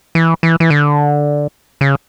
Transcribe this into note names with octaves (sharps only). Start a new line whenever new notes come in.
E3
E3
E3
D3
C#3